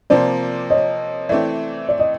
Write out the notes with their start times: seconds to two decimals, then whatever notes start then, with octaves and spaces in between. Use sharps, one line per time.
0.10 C3 F3 A#3 C5 D5
0.70 C#5 D#5
1.29 E3 A3 C4 D5 E5
1.89 D5
1.99 D#5